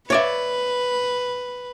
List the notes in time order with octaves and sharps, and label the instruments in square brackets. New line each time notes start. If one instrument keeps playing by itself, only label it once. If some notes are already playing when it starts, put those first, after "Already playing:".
[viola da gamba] B4 [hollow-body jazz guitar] C#5 D5 E5